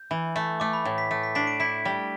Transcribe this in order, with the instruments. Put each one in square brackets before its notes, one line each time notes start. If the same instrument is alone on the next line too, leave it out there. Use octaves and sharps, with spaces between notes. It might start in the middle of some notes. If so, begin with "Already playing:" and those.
Already playing: [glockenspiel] G6
[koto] E3
A3
[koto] A3 [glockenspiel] D6
[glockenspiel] B5
[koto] A2
[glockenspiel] B6
[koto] A3
[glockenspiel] B6
[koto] D4 [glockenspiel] B6
[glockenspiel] D7
[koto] E4 [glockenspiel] B6
[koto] G3